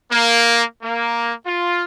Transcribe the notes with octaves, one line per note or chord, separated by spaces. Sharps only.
A#3
A#3
F4